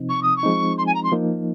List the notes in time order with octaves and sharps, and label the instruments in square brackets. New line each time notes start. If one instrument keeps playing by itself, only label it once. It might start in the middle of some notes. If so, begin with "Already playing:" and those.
Already playing: [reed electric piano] C3 F3 C4 D#4
[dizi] C#6
D#6
C#6
[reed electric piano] F3 G#3 C4 D#4
[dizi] C6
G#5
A#5
C6
[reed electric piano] F3 A#3 D#4